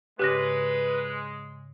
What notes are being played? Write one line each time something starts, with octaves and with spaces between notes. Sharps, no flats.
G#2 C#3 G#3 G4 B4 D#6 F#6 A#6